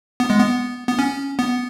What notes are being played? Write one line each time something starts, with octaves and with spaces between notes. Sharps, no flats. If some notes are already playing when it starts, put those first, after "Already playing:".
B3
G#3
B3
B3
C#4
B3